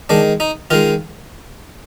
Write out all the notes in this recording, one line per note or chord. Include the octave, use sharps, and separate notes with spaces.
D#3 G#3 D4
D#4
D#3 G#3 F4